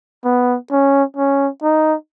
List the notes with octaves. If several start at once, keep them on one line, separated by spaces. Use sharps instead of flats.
B3
C#4
C#4
D#4